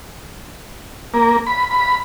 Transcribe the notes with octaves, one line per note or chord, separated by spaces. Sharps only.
A#3
B5
B5